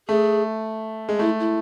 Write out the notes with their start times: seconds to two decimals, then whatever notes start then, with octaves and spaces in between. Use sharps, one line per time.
0.08 A3 G#4
1.09 G#3
1.19 A3 E4
1.40 E4